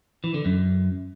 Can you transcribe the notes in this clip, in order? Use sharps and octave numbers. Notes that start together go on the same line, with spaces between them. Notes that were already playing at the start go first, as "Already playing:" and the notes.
E3
D3
F#2